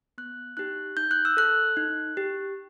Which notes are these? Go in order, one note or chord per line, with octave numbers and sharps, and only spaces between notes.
B3 F#6
D#4 G4 F#6
D#4 G6
F#6
E6
A4 F#6
D#4
G4